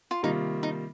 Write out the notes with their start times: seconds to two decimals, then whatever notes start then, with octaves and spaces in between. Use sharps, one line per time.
0.11 F4
0.23 C3 D#3 G3 A#3 D#4 F4
0.63 D#4